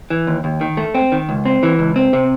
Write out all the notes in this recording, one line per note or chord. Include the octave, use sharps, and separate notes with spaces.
E3
D#2
D#2
D#3
A3
C4
D#3
C#2
C4
E3
C#2
C4
C3